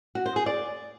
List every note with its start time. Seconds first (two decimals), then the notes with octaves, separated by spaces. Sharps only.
0.15 F#4
0.26 C5
0.36 G#4
0.46 D5